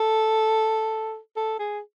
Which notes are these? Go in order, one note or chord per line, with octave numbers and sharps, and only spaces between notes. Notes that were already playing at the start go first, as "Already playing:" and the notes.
Already playing: A4
A4
G#4